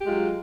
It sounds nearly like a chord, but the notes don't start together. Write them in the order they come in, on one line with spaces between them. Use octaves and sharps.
G4 G#3 F4 F#3